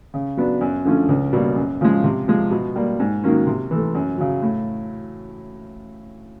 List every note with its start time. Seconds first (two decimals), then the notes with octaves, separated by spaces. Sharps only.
0.14 C#3
0.37 F#3 B3 D4
0.61 F#2
0.85 D3 F3 A3 C#4
1.09 C#2
1.33 B2 G3 A#3
1.56 F#2
1.81 C#3 F3 G#3
2.04 C3
2.28 F3 G#3
2.51 B2
2.76 G3 A#3
3.00 G#2
3.24 D#3 F#3 A#3 C#4
3.47 C3
3.71 E3 A3
3.95 F#2
4.18 C#3 F#3
4.42 A2